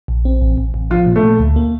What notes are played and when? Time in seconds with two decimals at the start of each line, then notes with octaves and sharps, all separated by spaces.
0.08 A#1
0.25 C4
0.41 A1
0.58 A1
0.74 A1
0.90 F3 F4
1.06 A#2
1.16 A3
1.23 A#2
1.39 D2
1.56 A#3